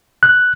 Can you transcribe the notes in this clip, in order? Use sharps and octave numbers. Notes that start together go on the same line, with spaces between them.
F#6